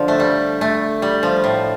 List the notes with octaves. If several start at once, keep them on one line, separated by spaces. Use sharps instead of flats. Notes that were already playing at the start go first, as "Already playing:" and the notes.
Already playing: D3 F3
A3
G3
A3
G3
F3
A2